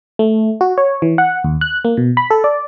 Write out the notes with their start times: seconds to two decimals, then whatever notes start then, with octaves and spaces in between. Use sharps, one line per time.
0.19 A3
0.61 F#4
0.78 C#5
1.02 E3
1.18 F#5
1.44 D#2
1.61 F#6
1.85 A#3
1.97 B2
2.17 B5
2.31 A4
2.44 D5